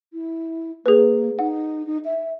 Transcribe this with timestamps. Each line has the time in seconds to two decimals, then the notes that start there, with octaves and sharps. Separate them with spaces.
0.13 E4
0.86 A#3 G#4 B4
1.39 D#4 F#5
1.87 D#4
2.05 E5